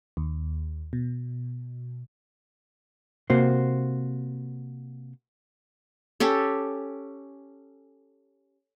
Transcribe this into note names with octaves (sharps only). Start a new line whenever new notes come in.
D#2
B2
C3 A#3 F#4 C5
C#4 G4 A4